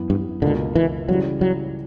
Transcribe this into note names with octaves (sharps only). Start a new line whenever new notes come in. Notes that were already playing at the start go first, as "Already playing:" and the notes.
Already playing: F#2 E3 B3
G2
C#2 B2 D3 A#3
E3
C#3 E3 F#3 G3
F#3